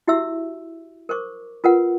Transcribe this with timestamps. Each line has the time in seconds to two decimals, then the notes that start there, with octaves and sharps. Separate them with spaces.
0.08 E4 F#4 G4 E5 C6 E6
1.09 A#4 C5 C#6 D6
1.64 F4 A#4 B4 F#5